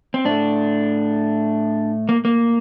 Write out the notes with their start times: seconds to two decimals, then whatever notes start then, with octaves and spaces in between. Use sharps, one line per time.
0.14 C4
0.25 A2 A3 D4
2.09 A#3
2.25 A#3